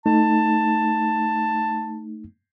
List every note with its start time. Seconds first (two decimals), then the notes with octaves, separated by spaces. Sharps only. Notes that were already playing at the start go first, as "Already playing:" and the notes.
0.06 A3 D#4 A5